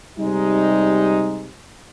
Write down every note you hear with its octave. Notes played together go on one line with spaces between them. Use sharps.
C3 G3 G#3 D#4